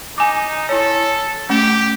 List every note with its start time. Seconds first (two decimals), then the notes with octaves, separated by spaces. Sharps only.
0.18 D#4 G#5 D6
0.69 E4 A4 C#5
1.49 A3 C#4 G4